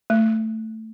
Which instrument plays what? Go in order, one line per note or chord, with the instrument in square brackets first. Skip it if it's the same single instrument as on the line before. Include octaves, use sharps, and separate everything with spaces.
[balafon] A3